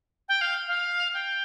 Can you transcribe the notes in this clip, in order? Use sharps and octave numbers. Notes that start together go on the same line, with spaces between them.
G5
F5
F5
G5